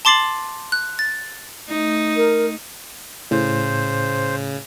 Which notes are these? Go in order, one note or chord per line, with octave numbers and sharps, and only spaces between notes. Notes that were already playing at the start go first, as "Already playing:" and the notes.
A5 C6 D6 A6 C7 F#7
F#6
A6
A3 D#4
A#4
A2 C#3 C5